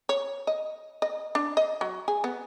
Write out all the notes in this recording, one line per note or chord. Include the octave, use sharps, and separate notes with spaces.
C#5
D#5
D#5
D4
D#5
F#3
G#4
B3